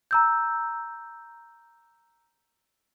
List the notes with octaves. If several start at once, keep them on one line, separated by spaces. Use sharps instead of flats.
A#5 E6 G6